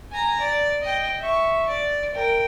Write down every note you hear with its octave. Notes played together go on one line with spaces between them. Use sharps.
G#5 A#5
D5
D#5 G5
E5 C#6
D5
A#4 G5